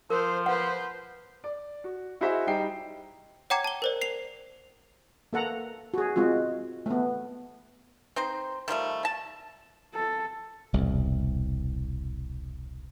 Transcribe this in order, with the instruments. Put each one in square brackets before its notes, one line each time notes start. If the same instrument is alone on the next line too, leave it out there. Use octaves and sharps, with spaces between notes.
[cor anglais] F3 [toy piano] A#4 [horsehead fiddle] C5
[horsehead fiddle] B4 C5 [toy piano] F#5
[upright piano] D5
F#4
E4 F#4 G#4 C5 D#5 E5
G3 D#4 G5 C7
[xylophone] C#5 F#5 G5 A#5 D6 G#6
A5 G7
A#4 C5 D5
C7 F7
[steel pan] A#3 A4 F#5 A#5
F#4 G#4
G#3 C4 F4 F#4
A3 B3
[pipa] C4 D#4 C5
D#3 F3 G3 A3
A5
[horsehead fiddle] A4
[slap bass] E1 C2